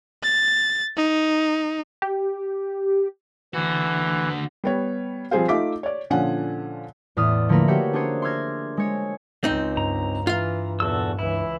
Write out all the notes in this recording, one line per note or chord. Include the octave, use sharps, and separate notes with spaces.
A6
D#4
G4
D3 E3 F#4
G3 B3 C#5
F3 G3 C4 G#4 C5 F5
A3 D#4 F4 E5 D6 B6
C#5 D5
A#2 D3 F3 C#4 F#5 G#5
E2 A2 D5 E5 D#6 F6
D3 F3 A3 A#3 A#4 B4
F#4 G4 C#5 E5 F#5 G5
C#4 D4 G#4 C5 C#5
C6 D6 E6 F6 G#6 A#6
G#3 C#5
C#2 C4 D#4
G2 A#5
E3 F4 F5
E2 A#2 F#4 A4 E6
C#2 E3 E4